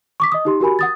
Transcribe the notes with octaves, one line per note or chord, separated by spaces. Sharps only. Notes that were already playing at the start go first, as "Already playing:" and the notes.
C#6 D6 B6
D#5 D#6
D#4 G4 C6
F#4 G4 A#4 G#5 B5
F#5 D#6 A6